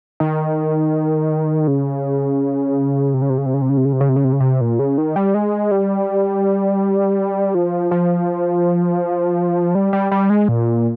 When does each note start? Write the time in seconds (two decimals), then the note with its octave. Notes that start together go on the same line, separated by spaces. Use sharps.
0.20 D#3
1.67 C#3
3.14 C3
3.22 C#3
3.30 C3
3.38 C#3
3.46 C3
3.54 C#3
3.62 C3
3.69 C#3
3.77 C3
3.85 C#3
3.93 C3
4.01 C#3
4.09 C3
4.16 C#3
4.24 C3
4.33 C#3
4.40 C3
4.61 A#2
4.79 C#3
4.98 D#3
5.16 G3
5.34 G#3
5.71 G3
7.55 F3
7.91 F3
9.75 G3
9.93 G3
10.12 G3
10.30 G#3
10.48 A#2